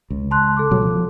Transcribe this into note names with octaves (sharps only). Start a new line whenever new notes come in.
C#2
A5 C6 F#6
A4 D6
B2 F#3 G#3
F3